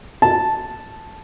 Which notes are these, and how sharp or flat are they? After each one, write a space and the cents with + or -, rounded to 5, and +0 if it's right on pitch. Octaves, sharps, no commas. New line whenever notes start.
A5 -5